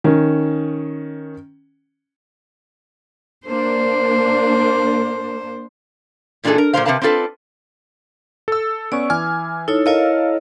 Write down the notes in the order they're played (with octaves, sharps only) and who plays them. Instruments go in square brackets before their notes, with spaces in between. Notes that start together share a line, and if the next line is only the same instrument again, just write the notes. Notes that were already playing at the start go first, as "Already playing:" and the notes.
[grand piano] D#3 C#4
[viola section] A#3 D4 [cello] C5
[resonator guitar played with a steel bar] E2 A#2 D4 D#4 G#4 A4
A#4
A#2 F#3 G#3 A#4 C5 F5
C3 C4 A#4 B4 F5 A5
C4 D4 F4 A4 B4
[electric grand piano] A4 E6
[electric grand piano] B3 C#4 C#6 [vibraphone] D5
[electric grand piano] E3 G#5 F6 [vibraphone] D6
[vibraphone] D#4 E4 C#5 [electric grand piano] A4
[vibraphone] E4 C#5 D#5 [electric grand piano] A4 A#4 F5